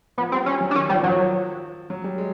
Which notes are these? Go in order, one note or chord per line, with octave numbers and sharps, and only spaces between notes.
F3 B3
G3 C4
F#3 C#4
F#3
D4
D#3 C#4
F3 G3
F3 F#3
F#3
G3
G#3